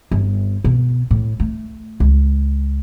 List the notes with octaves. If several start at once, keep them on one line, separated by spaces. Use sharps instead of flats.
G1
B2
A2
A3
C#2